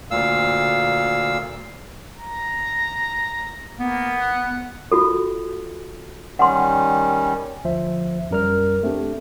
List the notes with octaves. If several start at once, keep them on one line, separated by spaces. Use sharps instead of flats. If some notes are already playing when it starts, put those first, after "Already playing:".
D2 A#2 F5 E6
A#5
A#3 B3
F#5
F4 F#4 A4
D#3 G3 C#4 F#5 C6
D2 F3 C5 E5
F#2 G3 A#4 D5 F6
A3 C4 D4 G4